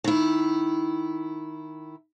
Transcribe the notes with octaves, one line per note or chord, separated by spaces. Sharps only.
D#3 E4